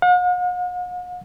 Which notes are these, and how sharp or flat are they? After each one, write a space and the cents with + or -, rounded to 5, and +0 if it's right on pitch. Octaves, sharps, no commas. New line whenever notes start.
F#5 -45